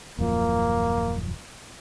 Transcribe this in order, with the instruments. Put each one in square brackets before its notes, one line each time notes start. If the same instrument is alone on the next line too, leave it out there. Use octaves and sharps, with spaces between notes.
[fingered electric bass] D#1 F#2 F3 [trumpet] A#3